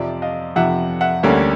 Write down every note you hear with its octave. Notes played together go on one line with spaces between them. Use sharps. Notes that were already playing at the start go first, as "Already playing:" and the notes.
Already playing: F2 C3 F3 D5 E5
D#5 F5
F2 C3 F3 E5 F#5
E5 F#5
D2 D3 G3 A#3 C#4